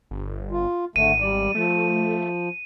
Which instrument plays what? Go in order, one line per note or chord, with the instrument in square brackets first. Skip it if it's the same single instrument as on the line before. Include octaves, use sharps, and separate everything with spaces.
[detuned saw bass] G1
[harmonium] F4
[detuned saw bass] G#1 [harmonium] D3 A3 [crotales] D#7
[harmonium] G3 D5
[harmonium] F3 [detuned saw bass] A3